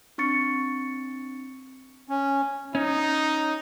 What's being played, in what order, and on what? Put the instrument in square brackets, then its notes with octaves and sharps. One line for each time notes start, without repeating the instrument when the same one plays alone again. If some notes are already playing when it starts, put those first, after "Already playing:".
[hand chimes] C4 D4 C#6 A6 C#7
[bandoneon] C#4
[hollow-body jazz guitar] C#4 [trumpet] D#4